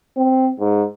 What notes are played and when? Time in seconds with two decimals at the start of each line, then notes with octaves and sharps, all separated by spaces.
0.17 C4
0.60 G#2